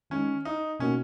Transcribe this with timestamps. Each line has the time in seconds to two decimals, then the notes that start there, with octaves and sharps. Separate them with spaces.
0.10 D#3 G#3 C#4 D#4
0.45 D#4
0.80 B2 A#3 C#4 D#4 F#4